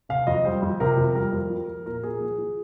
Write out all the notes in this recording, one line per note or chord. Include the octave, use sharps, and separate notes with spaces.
C3 F5
F2 D#5
G3 C5
F2
C3 A#4
F2
G3 A#4
F2
F3
F3
A#2 A#4
A#2 G#4
F3
F3